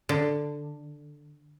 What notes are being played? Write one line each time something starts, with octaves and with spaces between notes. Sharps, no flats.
D3